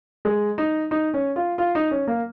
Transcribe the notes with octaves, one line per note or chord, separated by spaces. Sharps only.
G#3
D#4
D#4
C#4
F4
F4
D#4
C#4
A#3